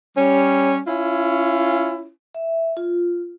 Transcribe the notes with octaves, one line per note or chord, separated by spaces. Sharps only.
G3 C#4
C#4 E4 F4
E5
F4